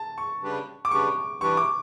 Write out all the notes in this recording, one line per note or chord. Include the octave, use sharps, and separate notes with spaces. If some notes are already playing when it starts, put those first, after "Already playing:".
Already playing: A5
C#6
C#3 G3 D4 G4 B4
D6
C#3 G3 D4 G4 B4 C#6
E3 G3 D4 G4 B4 C#6
D6